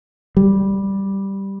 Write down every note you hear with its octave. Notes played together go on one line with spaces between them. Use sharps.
G3